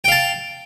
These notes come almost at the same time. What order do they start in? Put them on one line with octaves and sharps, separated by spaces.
G5 F5 A5